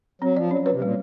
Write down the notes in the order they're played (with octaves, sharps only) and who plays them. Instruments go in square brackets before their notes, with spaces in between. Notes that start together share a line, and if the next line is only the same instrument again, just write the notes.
[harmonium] F#3 [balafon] C4
[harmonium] F3 [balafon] D5
[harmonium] F#3 [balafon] C#4
[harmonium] F#3
[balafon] B4
[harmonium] C3
[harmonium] A#2 [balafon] G3